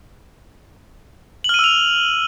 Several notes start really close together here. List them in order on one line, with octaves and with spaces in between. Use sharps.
F#7 F6 D#7 E6 F7